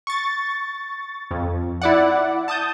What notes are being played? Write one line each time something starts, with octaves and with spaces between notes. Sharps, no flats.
C#6 A6
F2
E4 D5 F#5
A5 D#6 G6